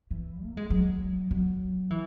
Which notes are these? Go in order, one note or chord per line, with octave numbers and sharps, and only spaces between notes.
E3
A#3
G#3
F#3
F#3
E3